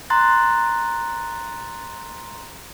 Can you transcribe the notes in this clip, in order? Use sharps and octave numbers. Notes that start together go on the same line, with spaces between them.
A#5 C6 F#6 A6